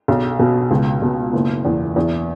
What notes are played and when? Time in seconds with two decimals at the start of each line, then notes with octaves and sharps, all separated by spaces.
0.08 B1
0.39 B2
0.71 C#2
1.02 B2
1.33 F#1
1.65 E2
1.96 E2